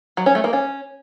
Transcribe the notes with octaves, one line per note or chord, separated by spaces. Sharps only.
F#3
C#4
A3
A#3
C#4